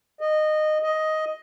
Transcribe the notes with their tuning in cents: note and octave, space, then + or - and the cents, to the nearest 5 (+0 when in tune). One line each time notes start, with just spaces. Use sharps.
D#5 -15
D#5 +10